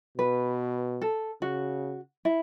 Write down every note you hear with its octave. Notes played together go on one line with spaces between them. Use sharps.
B2 B4
A4
C#3 F#4
E4